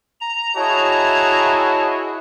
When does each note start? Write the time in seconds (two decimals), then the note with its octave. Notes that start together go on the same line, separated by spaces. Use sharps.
0.21 A#5
0.57 E4 F#4 G#4 C#5 D#5 A5